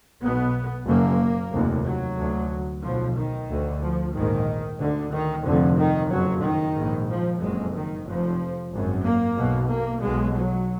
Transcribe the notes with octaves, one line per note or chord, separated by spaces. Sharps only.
B1 B2 B3
F#1 F#2 A#3
F1 D#2
F#3
D2
B1 B2 F3
D#3
D2
F3
A#1 G#2 D#3
D2 D3
D#3
F1 F2 D3
D#3
F#1 F2 F#3
D#3
A#1 G#2
F3
F#1 F2 G#3
D#3
F1 F2 F3
G#1 F#2
A#3
B1 B2
A#3
B1 B2 G#3
F#3